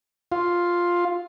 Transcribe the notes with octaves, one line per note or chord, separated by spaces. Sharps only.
F4